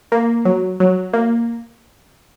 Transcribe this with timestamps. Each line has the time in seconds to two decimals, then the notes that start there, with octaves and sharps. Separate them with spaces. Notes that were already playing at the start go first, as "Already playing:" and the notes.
0.12 A#3
0.45 F#3
0.80 F#3
1.13 A#3